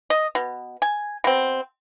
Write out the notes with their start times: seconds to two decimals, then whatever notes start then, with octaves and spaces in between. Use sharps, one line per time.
0.10 D#5
0.35 B2
0.82 G#5
1.24 B2 C4